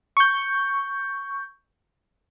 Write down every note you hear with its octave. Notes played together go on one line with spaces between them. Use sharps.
C#6 G6